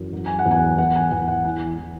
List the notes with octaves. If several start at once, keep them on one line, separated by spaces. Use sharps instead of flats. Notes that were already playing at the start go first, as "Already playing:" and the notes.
Already playing: F#2 E3
F#3
G#5
F#5
E2
G#5
E2 F#5
G#5
E2 F#5
F#5
E3 G#5
E3